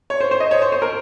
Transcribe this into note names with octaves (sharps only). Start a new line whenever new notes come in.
C#5
C5
C5
D#5
C#5
C5
C5
A#4